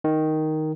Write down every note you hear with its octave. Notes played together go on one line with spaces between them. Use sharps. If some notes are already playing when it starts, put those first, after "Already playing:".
D#3